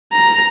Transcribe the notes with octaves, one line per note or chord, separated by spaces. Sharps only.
A#5